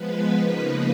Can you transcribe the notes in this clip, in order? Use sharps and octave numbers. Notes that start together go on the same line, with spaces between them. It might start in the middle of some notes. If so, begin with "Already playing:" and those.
Already playing: F3 G#3 B3 B4
C#3 F3 A#3 D#4